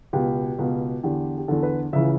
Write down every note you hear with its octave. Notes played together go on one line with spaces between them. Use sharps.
C#2 B2 G4
C#2 B2
E2 D3 G4
G4
E2 D3 A4
B4
C#2 C#3 E3 E5